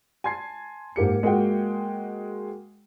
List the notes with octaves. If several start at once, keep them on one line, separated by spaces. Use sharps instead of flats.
G#5 A5 C6 G#6 C7
G#2 A#3 G4 C#7
G#3 A#3 F#4 F#5 G5